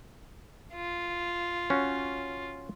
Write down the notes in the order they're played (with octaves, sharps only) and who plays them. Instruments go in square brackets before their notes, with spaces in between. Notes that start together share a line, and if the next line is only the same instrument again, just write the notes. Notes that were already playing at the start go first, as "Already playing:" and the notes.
[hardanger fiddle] F4
[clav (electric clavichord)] C#4 F#4